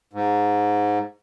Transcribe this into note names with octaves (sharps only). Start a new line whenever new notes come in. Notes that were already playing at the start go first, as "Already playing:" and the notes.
G#2